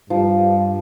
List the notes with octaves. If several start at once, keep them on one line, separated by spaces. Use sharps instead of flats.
G2 F3